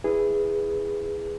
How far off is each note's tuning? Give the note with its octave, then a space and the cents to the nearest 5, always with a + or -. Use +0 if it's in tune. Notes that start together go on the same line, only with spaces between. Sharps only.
E4 +0 G#4 -10 B4 +0